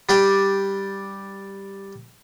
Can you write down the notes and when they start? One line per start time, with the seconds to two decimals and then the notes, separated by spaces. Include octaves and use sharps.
0.09 G3 D4 G4 G5